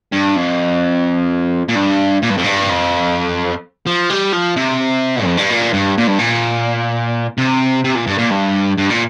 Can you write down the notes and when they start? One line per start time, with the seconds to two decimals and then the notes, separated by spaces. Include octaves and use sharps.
0.12 G2
0.36 F2
1.69 A#2
1.75 G2
2.23 A#2
2.30 G2
2.38 F2
2.44 G2
2.70 F2
3.87 F3
4.10 G3
4.33 F3
4.56 C3
5.23 F2
5.37 G2
5.50 A#2
5.73 G2
5.98 A#2
6.08 G2
6.19 A#2
7.38 C3
7.85 C3
7.95 A#2
8.07 G2
8.18 A#2
8.31 G2
8.78 G2
8.90 A#2